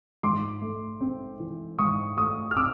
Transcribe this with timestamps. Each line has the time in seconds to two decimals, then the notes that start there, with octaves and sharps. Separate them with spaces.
0.23 G#2 C6 D6
0.62 A3
1.01 C4
1.40 E3
1.79 G#2 C#6 D#6
2.17 A3 C#6 D#6
2.51 F6
2.56 C4 D6 E6